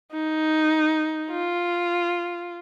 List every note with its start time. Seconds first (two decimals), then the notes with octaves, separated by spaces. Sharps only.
0.12 D#4
1.30 F4